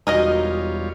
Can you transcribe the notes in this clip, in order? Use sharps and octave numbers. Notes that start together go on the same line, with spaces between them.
E1 G3 D#4 F4 F#4 A#4 C#5 D#5